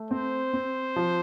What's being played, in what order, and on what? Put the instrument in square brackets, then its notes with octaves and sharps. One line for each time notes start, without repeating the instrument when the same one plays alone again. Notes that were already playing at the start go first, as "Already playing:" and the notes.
Already playing: [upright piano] A3
[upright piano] C4 [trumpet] C5
[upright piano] C4
F3